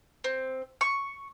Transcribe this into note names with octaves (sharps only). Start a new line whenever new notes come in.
C4
C#6